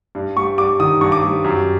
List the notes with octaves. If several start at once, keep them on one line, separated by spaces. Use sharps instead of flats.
G2
G3 C#6
G2 D6
D#3 D#6
G2 C#6
D6
G3
F#2